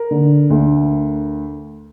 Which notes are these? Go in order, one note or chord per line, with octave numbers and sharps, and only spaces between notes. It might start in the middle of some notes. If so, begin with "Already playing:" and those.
Already playing: A#4
D3
D2